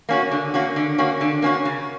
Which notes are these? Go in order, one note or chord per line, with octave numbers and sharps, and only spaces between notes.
A#3 C#4 F#4
D3
A#3 C#4 F#4
D3
A#3 C#4 F#4
D3
A#3 C#4 F#4
C#3